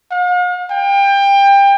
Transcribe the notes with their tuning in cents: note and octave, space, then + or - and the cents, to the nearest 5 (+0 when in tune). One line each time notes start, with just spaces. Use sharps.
F5 +45
G5 +25